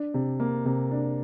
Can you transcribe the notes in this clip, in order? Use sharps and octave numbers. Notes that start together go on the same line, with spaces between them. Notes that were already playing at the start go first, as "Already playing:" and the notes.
Already playing: D4
C3
A#3
C3
D4